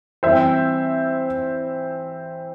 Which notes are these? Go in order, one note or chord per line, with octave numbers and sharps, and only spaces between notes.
E3 G3 C4 C5 E5